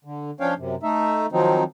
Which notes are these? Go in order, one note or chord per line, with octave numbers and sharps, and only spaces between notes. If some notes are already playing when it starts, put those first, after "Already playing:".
D3
F3 C#4 D4 C#5 F5 G5
F#2 C3
A3 D#4 E5
D#3 F3 F#3 C4 D#4